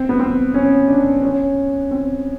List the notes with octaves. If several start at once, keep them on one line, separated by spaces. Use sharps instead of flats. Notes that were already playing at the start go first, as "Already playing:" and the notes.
Already playing: C4
B3
C4
C#4
D4
C#4
C4